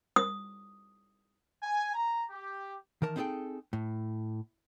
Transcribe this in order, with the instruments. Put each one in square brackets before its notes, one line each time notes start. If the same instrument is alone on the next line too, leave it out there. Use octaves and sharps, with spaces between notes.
[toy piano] D#6
[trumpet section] G#5
A#5
G4
[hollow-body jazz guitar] D#3 E3 A#4 A5
C4 D#4 E4 G#4 A4 G5
A2